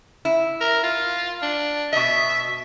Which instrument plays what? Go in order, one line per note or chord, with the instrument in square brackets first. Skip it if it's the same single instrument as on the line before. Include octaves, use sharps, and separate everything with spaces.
[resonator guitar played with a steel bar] E4
[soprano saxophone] A#4
F4
D4
[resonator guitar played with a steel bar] B2 D#5 [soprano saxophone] E5